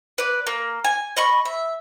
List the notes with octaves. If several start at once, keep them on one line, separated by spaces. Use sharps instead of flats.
B4 D5
A#3
G#5
D#5 B5 C#6
E5